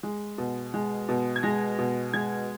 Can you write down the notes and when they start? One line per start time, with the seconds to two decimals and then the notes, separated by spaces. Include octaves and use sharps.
0.03 G#3
0.38 B2
0.74 G#3
1.09 B2
1.36 G#6
1.43 G#3 A#6
1.79 B2
2.13 G#3 G#6